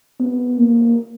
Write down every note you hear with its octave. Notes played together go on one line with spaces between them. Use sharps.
B3
A#3